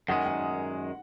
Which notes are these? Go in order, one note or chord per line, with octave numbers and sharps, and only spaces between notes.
F#2 D#3 G#3 F#5
F#5